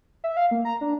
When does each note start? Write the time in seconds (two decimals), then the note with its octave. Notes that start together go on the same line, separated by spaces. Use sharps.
0.24 E5
0.37 F5
0.51 A#3
0.65 A#5
0.81 D4